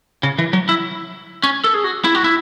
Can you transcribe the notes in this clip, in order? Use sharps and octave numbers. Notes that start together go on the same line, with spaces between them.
C#3
E3
F#3
E4
C#4
A4
G#4
F#4
E4
F#4
E4